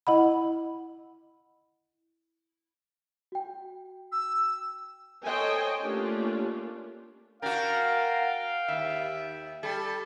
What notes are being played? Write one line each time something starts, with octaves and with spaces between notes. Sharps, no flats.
E4 D#5 F#5 B5
F#4 G5
E6
A4 C5 C#5 D#5 G5 G#5
A3 A#3 C#4 D4 F4 G4
D4 F#4 A#4 F5 G5
D#2 E5
G3 A4